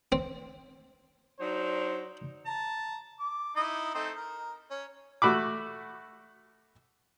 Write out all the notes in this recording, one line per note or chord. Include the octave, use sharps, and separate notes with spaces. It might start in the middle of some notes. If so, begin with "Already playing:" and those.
C4
F#3 D4 D#4 C5
A5 A#5
D6
D#4 E4 D#5
A3 C4 D#4
A#4
C#4
A3 F#4 B5 D6